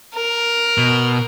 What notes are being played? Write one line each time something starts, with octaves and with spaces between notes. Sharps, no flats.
A#4
B2